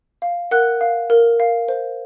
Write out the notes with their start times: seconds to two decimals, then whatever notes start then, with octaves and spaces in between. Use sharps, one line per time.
0.22 F5
0.51 A#4 F#5 F#6
0.81 F5
1.10 A#4
1.40 F5
1.69 C5